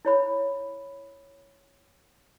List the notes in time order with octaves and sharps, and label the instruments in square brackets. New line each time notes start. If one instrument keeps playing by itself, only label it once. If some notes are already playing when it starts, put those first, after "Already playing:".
[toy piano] E4 C#5 B5